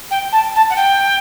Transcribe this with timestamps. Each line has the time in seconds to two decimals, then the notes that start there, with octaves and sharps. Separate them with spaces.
0.11 G5
0.32 A5
0.55 A5
0.70 F#5
0.76 G5